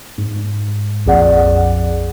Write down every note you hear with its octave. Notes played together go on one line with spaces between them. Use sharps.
G#2
A#1 F2 G#4 D5 F#5